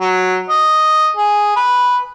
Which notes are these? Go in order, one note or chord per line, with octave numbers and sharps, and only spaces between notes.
F#3
D#5
G#4
B4